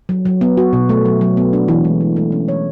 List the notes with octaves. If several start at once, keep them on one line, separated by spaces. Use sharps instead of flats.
F#3
F#3
B3
F#4
B2
A3
F#3
F#3
B3
D4
E3
G#3
A3
A3
C#4
C#5